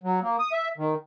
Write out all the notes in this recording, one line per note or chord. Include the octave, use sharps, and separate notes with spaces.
F#3
A#3
D#6
E5
D#3